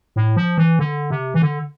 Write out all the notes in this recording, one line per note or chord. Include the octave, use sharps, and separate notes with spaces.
A2
F3
E3
D3
C3
E3
D3